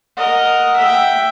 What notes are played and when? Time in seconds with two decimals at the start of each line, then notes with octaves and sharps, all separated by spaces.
0.17 A#4 D#5 F#5
0.78 E5 G5